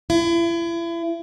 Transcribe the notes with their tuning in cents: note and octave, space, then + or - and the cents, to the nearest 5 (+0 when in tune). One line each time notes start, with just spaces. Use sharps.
E4 +35